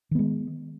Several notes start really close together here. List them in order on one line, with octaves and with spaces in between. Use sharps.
D#3 B3 G#3